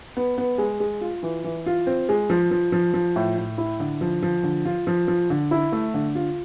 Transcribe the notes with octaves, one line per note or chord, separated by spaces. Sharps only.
B3
B3
G#3
G#3
F4
E3
E3
F4
C4
G#3
F3
F3
F3
F3
A2
A2
E4
D3
F3
F3
D3
F4
F3
F3
D3
E4
A3
D3
F4